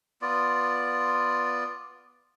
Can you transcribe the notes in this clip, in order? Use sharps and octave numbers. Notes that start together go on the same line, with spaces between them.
B3 F4 D5